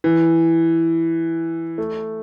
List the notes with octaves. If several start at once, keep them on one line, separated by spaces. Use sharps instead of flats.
E3
A3